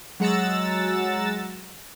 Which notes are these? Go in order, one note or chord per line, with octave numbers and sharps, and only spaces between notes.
F#3 G#3 F#5 A#5 E6 A6